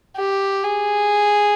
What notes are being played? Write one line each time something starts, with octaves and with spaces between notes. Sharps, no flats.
G4
G#4